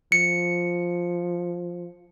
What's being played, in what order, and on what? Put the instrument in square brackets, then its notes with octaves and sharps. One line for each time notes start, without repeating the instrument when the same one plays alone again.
[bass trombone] F3 [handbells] C#7